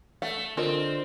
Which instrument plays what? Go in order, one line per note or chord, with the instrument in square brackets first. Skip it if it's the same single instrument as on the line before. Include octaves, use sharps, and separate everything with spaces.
[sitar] A3 [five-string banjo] F#5
[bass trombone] D3 [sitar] C4 [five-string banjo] F4 A#4 D#5